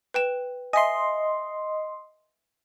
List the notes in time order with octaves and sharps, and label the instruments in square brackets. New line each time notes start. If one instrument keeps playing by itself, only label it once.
[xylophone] B4 G5 E7
[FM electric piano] D#5 C6 [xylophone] E5 G#5